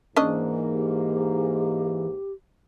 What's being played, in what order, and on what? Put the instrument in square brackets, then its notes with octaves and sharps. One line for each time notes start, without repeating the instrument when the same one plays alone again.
[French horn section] G#2 A#3 [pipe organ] E3 [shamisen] C#4 D4 D#5
[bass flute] G4